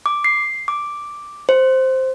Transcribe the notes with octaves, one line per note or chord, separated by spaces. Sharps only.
D6
C7
D6
C5